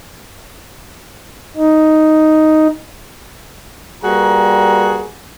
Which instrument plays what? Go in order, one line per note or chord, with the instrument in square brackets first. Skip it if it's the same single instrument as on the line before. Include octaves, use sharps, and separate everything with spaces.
[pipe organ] D#4
[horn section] G3 A#3 F#4 G#4 B4 A#5